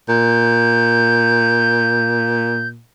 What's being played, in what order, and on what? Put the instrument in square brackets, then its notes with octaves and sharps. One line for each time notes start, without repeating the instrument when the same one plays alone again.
[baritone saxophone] A#2 [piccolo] G6